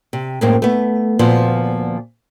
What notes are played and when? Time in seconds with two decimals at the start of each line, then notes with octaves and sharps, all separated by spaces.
0.13 C3
0.41 F#2 A2 G#3 A#3 C4
0.62 A3 B3
1.19 D2 A#2 F3 B3 F5